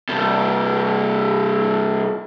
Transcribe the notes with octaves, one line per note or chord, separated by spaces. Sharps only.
G2 C3